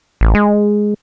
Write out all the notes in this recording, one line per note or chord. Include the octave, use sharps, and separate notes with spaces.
A1
G#3